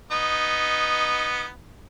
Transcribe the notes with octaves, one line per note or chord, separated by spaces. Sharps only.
B3 D#4